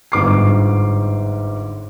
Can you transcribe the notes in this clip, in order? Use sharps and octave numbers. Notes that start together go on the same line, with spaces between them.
G1 G#2 D6 C7